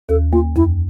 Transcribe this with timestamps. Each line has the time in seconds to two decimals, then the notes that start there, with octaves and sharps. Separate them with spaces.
0.09 D#2 A4
0.33 A#3 F4
0.56 F2 E4